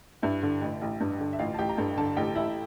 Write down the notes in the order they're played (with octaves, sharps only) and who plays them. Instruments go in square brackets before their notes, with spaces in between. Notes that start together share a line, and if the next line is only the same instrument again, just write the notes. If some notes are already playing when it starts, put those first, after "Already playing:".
[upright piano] G2 [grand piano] E4 E5
[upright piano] D3
A1
A1
G2
D3
[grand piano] E5
[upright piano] A1 [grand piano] F4 F5
[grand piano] A5
[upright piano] A1 [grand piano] G4 G5
[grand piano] A#5
[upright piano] G2 [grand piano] A4 A5
[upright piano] D3 [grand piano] A4 A5
[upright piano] A1 [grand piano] G4 G5
[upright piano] A1 [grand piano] E4 E5